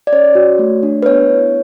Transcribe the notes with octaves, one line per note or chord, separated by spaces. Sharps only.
D5
C#4 C#5
F#4
A3
D4
B4
B3 C#5
E4